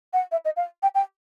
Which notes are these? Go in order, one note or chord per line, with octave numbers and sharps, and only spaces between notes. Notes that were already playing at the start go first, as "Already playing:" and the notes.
F#5
E5
D#5
F5
G5
G5